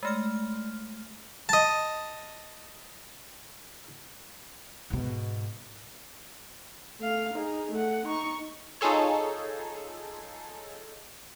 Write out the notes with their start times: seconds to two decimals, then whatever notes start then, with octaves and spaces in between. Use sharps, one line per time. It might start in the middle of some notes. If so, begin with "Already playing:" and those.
0.03 G#3 A3 F6
1.49 D#5 A5
4.90 G#2 B2
7.00 A3 F5
7.34 D#4 G#4
7.72 A3 F#5
8.06 D#4 C#6
8.81 D#4 F4 G#4 A4 C#5